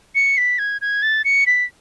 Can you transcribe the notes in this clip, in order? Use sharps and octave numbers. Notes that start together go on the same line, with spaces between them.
C#7
B6
G#6
G#6
A6
C#7
B6